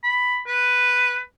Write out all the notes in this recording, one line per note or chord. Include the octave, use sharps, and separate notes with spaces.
B5
B4